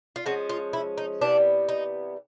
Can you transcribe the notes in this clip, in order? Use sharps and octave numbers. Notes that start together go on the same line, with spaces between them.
F4
F3 G#3 C#4 F#4
F4
E4
D#4
C3 E3 G3 B3 D4
D#4